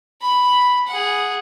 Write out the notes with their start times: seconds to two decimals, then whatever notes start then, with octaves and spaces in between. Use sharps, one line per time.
0.21 B5
0.87 G#4 F#5